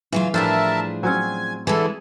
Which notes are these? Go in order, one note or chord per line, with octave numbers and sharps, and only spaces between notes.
C#3 E3 F#3 F4
A2 F3 G3 D4 G#4 A#4 E5 A5
F#3 C4 C#4 G#5
D3 E3 G#3 E4 G#4 A4